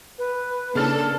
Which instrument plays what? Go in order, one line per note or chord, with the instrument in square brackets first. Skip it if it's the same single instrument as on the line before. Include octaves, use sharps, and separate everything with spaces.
[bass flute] B4
[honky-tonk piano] C#3 F6 A6 [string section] A#3 D4 A4